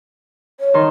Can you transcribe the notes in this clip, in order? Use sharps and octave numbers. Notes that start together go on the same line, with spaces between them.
C#5
D#3 C6